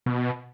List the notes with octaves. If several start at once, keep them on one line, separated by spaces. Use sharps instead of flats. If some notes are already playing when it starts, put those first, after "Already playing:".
B2